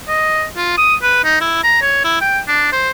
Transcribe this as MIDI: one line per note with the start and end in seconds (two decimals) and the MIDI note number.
0.08 0.45 75
0.57 0.76 65
0.78 0.95 87
1.03 1.21 71
1.24 1.37 63
1.41 1.60 64
1.63 1.76 82
1.81 2.02 73
2.04 2.16 64
2.21 2.39 79
2.48 2.72 62
2.72 2.91 72